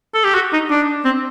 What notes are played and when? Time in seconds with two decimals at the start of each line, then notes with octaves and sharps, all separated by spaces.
0.14 A4
0.24 G4
0.34 F#4
0.53 D#4
0.70 D4
1.05 C4